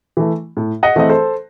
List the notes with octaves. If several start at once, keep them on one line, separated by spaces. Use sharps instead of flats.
E3 A3
A2
D#5 F#5
E3 A3 C4 D#5
A4 C5